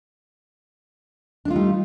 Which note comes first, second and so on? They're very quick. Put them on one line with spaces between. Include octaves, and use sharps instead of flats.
D4 A3 F4 D#4 G3